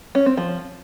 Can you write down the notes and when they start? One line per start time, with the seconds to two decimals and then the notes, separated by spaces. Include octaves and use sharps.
0.15 C#4
0.26 C4
0.37 F3